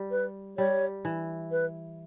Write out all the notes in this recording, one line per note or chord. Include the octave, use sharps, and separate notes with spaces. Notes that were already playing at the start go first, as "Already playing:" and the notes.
Already playing: G3
B4
G3 C#5
E3
B4